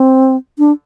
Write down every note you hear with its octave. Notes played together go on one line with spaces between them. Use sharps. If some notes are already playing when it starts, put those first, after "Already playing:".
Already playing: C4
D4